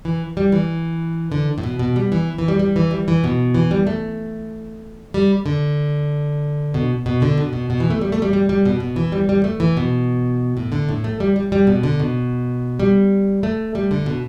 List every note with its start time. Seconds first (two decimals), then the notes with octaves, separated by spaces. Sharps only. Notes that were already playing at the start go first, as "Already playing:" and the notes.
0.05 E3
0.37 G3
0.52 E3
1.32 D3
1.58 A2
1.63 B2
1.79 B2
1.96 G3
2.12 E3
2.38 E3
2.48 G3
2.59 G3
2.76 E3
2.91 G3
3.08 E3
3.24 B2
3.55 E3
3.71 G3
3.87 A3
5.14 G3
5.46 D3
6.74 B2
7.06 B2
7.22 D3
7.37 B2
7.53 B2
7.70 B2
7.80 E3
7.90 A3
8.01 G3
8.12 A3
8.22 G3
8.33 G3
8.49 G3
8.65 B2
8.80 B2
8.96 E3
9.12 G3
9.29 G3
9.44 A3
9.60 E3
9.77 B2
10.57 A2
10.72 D3
10.89 A2
11.04 A3
11.20 G3
11.36 G3
11.52 G3
11.67 B2
11.83 D3
12.00 B2
12.80 G3
13.43 A3
13.75 G3
13.91 D3
14.06 B2